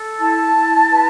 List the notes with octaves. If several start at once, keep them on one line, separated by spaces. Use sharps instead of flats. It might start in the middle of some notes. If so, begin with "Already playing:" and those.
Already playing: A4
E4 A5
E4
B4